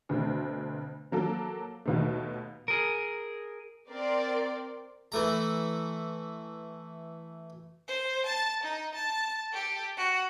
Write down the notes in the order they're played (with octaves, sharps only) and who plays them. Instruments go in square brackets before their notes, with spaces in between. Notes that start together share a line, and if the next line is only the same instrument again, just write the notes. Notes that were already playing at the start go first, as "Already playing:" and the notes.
[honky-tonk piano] D2 B2 A3 C4
F3 F#3 A#3 A4
D#2 B2 D#3 A3
[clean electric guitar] G#4 A#4
[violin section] C4 A#4 D5 C6
[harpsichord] E3 A3 A#5
[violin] C5
A5
D#4
A5
G4 A4
F#4